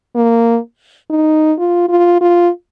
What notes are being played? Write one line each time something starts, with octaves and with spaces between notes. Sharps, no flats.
A#3
D#4
F4
F4
F4